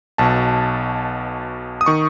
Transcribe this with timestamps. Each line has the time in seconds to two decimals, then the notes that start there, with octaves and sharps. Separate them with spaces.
0.18 B1 B2 A5
1.81 D#6
1.86 D#3 C#6